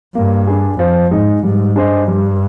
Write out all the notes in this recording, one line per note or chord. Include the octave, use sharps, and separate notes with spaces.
G2 A#3
D4 G#4
F2 F3
G#2 G#3 D#4
G#2 G3
G2 D4 G#4 C5 D#5
G3